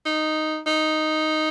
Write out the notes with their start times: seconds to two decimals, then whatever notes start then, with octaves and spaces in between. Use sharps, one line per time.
0.06 D#4
0.67 D#4